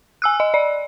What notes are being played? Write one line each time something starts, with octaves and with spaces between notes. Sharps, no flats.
G#5 E6 F#6
D#5
D5